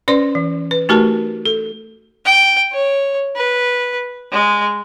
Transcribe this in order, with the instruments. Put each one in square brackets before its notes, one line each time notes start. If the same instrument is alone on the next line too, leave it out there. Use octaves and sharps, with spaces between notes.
[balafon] C#4 B4 C5 D5 C6
E3
B4
A3 D#4 F#4 G4 A#4 A5
A4
[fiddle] G5
C#5
B4
G#3